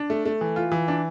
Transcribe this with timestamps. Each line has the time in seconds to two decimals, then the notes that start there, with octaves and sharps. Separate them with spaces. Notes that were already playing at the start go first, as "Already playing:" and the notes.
Already playing: D4
0.10 A3
0.25 A3
0.41 E3
0.56 F4
0.72 E3
0.88 D4